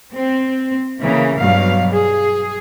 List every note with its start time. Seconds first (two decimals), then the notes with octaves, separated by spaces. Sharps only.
0.16 C4
1.00 C#3 E3 A#3
1.39 G2 B2 F#3 F5
1.92 G#4